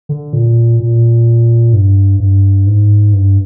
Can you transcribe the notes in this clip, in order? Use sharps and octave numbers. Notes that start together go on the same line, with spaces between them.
D3
A#2
A#2
G2
G2
G#2
G2